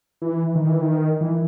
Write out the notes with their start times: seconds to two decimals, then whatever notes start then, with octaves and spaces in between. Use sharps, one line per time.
0.22 E3
0.55 D#3
0.69 E3
0.82 D#3
1.21 E3